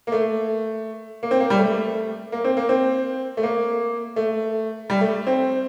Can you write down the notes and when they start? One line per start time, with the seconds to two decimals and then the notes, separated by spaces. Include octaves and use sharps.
0.07 A#3
0.12 A3
1.23 A#3
1.31 C4
1.40 A#3
1.50 G3
1.59 A3
2.32 A#3
2.44 C4
2.57 A#3
2.69 C4
3.37 A3
3.43 A#3
4.16 A3
4.90 G3
5.01 A3
5.27 C4